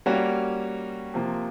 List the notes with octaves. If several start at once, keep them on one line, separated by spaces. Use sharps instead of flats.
G3 A#3 C#4 F#4
C3 F3 A#3